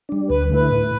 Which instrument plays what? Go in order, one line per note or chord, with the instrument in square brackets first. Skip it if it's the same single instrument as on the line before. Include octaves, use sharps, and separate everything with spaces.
[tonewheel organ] G3 D4
[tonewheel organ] D2 [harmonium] B4
[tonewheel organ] D3 A3 E4 [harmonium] B4
[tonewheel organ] A2